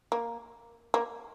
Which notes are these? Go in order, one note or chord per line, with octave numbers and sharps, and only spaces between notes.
A#3
A#3